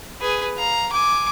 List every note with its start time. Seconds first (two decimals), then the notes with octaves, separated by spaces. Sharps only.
0.21 G#4 B4
0.58 F5 A#5
0.92 G#5 D6